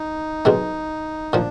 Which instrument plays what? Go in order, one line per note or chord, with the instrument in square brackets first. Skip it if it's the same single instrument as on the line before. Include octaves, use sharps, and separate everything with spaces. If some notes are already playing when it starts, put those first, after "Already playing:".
Already playing: [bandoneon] D#4
[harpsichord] B1 B2 G#3
[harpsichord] A#2 F3 [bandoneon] D4